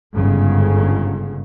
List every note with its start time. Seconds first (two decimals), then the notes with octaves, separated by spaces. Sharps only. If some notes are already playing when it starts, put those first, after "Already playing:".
0.14 G1 G#2 C#3